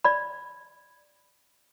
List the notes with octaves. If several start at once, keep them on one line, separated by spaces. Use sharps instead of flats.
D5 B5